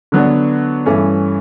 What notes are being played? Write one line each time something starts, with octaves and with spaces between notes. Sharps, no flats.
D3 F#3 B3 D4
G2 E3 A3 C#4